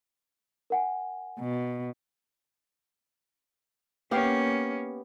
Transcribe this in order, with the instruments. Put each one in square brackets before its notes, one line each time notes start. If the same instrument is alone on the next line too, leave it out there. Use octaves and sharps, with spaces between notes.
[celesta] A#4 F#5 G#5
[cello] B2
[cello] A#3 C#4 [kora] B3 G4 F5